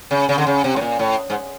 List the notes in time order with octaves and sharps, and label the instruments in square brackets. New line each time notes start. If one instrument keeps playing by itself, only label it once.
[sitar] C#3
C#3
D3
C#3
C3
A2
A#2
A2
G#2